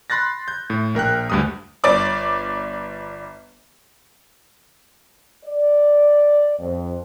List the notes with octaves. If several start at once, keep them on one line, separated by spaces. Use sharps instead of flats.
B5 C6 F#6 A6 A#6
G6
A2
A#1 A#4 G5 F#6
D2 G2 D#6
G1 C#5 D5 D6
D5
F2